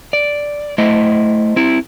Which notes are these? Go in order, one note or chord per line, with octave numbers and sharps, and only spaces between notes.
D5
A3 E4 C5 D#5
C4 E4